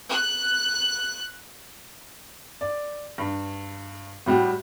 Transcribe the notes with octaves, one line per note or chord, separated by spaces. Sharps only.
F#6
D5
G2
A2 G3 F#4 G4